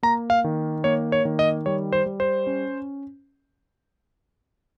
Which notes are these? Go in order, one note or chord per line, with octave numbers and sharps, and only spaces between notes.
A#3 A#5
F5
D#3
A#3 C#5
C#5
D#3
D#5
G3 C#5
C5
G3
C5
C#4